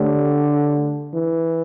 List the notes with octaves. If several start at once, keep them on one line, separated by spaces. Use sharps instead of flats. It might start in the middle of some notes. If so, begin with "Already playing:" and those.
Already playing: D3 A3 D4 G4 C#5
E3